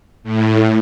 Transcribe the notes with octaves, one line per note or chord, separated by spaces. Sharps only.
A2